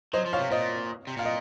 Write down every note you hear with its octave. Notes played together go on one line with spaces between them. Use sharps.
F#3 C5 D#5
F3
C#5 F5
C3
A#2 C5 D#5
C3
A#2 F5
D#5